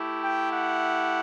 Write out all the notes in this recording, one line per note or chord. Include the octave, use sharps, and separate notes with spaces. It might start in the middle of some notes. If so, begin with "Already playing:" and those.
Already playing: A3 E4 G4
G5
F#5